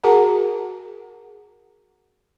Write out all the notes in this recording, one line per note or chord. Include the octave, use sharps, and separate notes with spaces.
F#4 G#4 A#4 F#5 A5 A#5